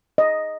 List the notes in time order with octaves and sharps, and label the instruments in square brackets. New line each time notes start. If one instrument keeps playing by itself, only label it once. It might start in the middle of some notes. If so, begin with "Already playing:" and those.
[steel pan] D#5